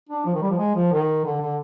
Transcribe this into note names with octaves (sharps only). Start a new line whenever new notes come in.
D4
F3
D#3
G3
F3
G#3
F3
D#3
D3
D3